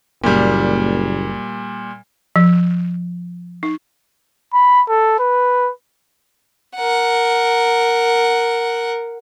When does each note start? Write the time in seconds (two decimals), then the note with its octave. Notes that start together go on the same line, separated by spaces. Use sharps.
0.24 F#1 A#2 G3
2.36 F3
3.63 D#4
4.54 B5
4.89 A4
5.19 B4
6.77 A#4 F#5